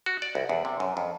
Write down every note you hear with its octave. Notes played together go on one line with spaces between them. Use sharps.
F#4
D5
C2
E2
C3
F#2
F2